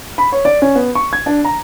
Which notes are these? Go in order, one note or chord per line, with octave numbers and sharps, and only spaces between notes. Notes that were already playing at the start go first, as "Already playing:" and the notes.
B5
C#5
D5
C#4
B3
C#6
G#6
D4
A#5